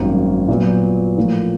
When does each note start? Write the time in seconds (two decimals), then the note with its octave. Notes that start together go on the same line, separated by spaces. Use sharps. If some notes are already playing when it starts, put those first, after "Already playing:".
Already playing: G#1 F#2 D#3 G3 A#3
0.48 A#2 F#3 B3
1.17 A2 F3 A#3